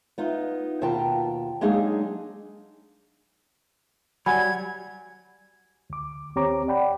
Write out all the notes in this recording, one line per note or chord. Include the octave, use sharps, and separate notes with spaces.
B3 D#4 F4
D#2 B2 F4 G5 A5 A#5
F#3 G#3 A#3 D4 D#4 G#4
F#3 G3 F#5 G#5 B5 G#6
D2 D6
D#2 C4 G4 C#5 A#5 D6
D5 F#5 G5 B5